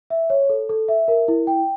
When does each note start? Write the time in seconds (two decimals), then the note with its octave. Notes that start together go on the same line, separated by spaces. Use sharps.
0.10 E5
0.30 C#5
0.50 A4
0.69 A4
0.89 E5
1.08 A#4
1.28 E4
1.47 G5